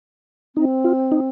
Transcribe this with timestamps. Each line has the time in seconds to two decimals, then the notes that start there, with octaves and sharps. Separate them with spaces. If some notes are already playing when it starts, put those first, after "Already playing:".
0.56 C4 D#4
0.84 F4
1.12 D#4